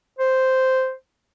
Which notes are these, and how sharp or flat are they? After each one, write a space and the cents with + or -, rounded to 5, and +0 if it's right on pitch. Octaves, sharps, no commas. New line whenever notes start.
C5 -5